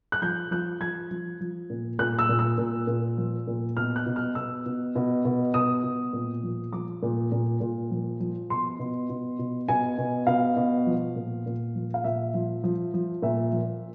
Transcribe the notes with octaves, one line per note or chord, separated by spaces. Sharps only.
F#6
F3 G6
F3 F#6
F3 G#6
F3
F3
A#2
A#2 F#6
E6
A#2
E6
A#2
A#2
F3
A#2
B2 F6
F#6
B2
F6
B2 E6
B2
B2
B2
B2 D#6
B2
A#2
F3
F3 D6
A#2
A#2
A#2
F3
F3
B2 C6
B2
B2
B2
B2 G#5
B2
B2 F5
B2
F3
A#2
A#2
F3
F5
A#2 E5
F3
F3
F3
A#2 E5
F3